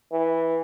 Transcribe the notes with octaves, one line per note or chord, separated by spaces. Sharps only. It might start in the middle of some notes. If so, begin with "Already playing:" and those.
E3